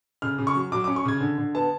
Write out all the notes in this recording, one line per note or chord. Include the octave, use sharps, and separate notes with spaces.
C#3 F6
C#3
C#6
F#3
F#3 D6
C#4 D6
C#6
C#3 G#6
D3
D3
B3 A5